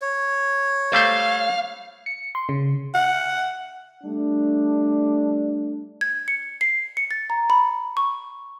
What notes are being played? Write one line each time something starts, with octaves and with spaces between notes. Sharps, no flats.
C#5
G3 A3 C5 F5
C#7
C6
C#3
F#5
G3 A3 D4
G#6
C#7
C7
C#7
A6
A#5
B5
C#6